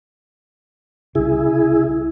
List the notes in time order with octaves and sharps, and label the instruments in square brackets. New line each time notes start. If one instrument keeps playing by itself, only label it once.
[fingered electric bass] C2 C#3 [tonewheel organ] E4 G#4